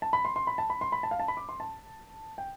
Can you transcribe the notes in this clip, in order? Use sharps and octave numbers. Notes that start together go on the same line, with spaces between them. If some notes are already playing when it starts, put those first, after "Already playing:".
A5
B5
C6
C6
B5
A5
B5
C6
B5
A5
F5
A5
B5
D6
C6
A5
G5